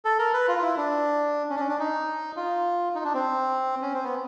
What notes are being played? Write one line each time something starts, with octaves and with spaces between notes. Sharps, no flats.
A4
A#4
B4
F4
F4
E4
D4
C#4
D4
C#4
D4
D#4
F4
D#4
D4
C4
C#4
C4
B3